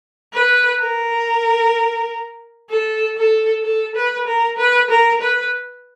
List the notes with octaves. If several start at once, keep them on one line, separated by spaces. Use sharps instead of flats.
B4
A#4
A4
A4
A4
B4
A#4
B4
A#4
B4